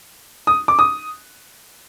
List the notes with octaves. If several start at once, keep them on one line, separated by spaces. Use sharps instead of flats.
D#6
D6
D#6